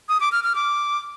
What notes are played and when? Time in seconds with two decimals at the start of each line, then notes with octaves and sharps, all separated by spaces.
0.09 D#6
0.20 D6
0.32 F6
0.44 F6
0.55 D6